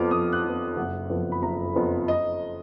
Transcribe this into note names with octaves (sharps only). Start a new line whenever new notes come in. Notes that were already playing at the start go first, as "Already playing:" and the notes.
Already playing: F2 F3 B3 D6 F6
F2 D#6
F#6
F3 B3
F#1 F#5
F2 F3 B3
B5
F#1 A#5
F2 F3 B3
D#5